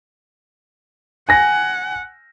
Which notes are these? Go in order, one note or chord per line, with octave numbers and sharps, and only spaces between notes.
F#5 G#5 A#6